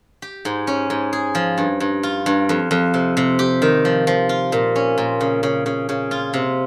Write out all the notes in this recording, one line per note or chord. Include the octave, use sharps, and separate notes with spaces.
G4
G#2
C#4
G#2
G#4
F3
G2
G2
F4
G2
F2
F2
C3
C3
G4
D#3
F3
F3
F4
A#2
C#4
A#2
C#3
C#3
C#3
C#3
F4
C3